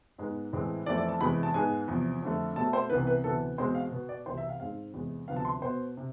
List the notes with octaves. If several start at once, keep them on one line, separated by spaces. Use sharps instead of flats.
G#2 G#3 B3
A2 E3 G#3 C4
F2 E3 A3 C4 D5
D5
A5
E2 C3 E3 G#3 B5
A5
G#2 G#3 B3 G#5
E2 C3 F3
F2 D3 A3
B2 A3 C4 A5
C5
C2 C3 E3 B3 B4
B4
D2 C3 E3 B3 A4
E2 B2 G#3 C4 C5
F5
B2 B3
D5
C2 C3 E3 C5
E5
F5
G#2 G#3 C4 F5
E2 C3 G#3
D2 C3 F3 B3 F5
A5
C6
B2 B3 C5
C3